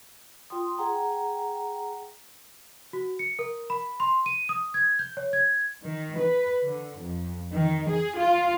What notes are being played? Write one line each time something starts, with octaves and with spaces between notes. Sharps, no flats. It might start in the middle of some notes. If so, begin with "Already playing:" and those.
F4 G5 C6 D#6
G#4 F#5 G5 A#5
F#4
C#7
A#4
B5
C6
D#7
D#6
G#6
G6
C#5
G#6
D#3
B4
D3
F2
D#3
G#4
F4